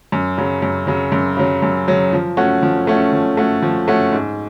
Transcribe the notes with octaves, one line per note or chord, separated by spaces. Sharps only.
F#2
C#3 F#3
F#2
C#3 F#3
F#2
C#3 F#3
F#2
C#3 F#3
F3
A3 C#4 F#4
F3
A3 C#4 F#4
F3
A3 C#4 F#4
F3
A3 C#4 F#4
G#2